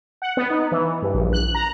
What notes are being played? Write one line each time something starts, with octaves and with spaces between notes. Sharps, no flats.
F#5
B3
D#4
E3
G2
A#1
F#6
A#5